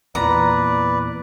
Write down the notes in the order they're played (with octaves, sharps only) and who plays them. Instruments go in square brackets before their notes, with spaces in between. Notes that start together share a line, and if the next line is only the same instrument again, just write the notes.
[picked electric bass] E2 A#2 [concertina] B4 D5 [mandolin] A#5